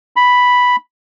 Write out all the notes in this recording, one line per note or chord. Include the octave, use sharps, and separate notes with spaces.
B5